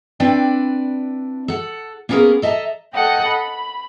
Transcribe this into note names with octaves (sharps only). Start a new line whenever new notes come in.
C4 D4 E4 B4 D5 G5
A4 F#5
A#3 B3 C#4 G#4 A#4
A4 D#5 E5 G5 A5 A#5
A4 D#5 F#5 G5
B5